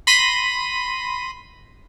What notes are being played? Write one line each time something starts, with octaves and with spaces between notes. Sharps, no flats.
B5 C6 A#6 B6 D#7